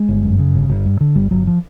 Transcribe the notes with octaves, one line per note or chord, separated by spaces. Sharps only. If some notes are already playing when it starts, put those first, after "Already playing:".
Already playing: G#3
G1
F#2
C#3
G1
G1
G2
D3
G1 G3
G1 F#3
F3